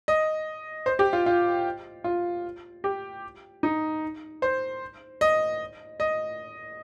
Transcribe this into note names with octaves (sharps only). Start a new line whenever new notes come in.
D#5
C5
G4
F4
F4
F4
G4
D#4
C5
D#5
D#5